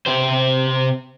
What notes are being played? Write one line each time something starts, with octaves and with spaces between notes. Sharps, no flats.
C3 G4 C5